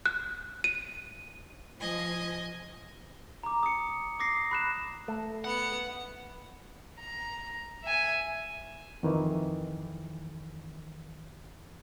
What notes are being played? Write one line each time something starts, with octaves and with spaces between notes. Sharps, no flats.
F#6
D#7
F3 D#5 G#5
A#5 D6
D#6 C#7
D6 D#6 A#6 C7
B5 F#6 E7
A3
B3 F#5 C#7
A#5
E5 G#5
F2 D#3 E3